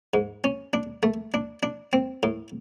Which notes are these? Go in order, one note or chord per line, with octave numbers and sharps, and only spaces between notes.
G#2
C#4
D4
A3
D4
D4
C4
A2